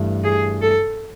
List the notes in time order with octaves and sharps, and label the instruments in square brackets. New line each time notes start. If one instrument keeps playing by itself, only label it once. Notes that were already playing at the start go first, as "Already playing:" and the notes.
Already playing: [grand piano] G2 E3 A3
[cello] G#4
A4